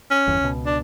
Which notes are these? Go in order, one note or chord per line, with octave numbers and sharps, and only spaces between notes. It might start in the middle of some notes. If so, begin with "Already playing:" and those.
C#4
G1 E2
C#2 B2
D4